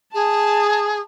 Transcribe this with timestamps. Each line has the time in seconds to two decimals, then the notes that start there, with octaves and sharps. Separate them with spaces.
0.14 G#4 A5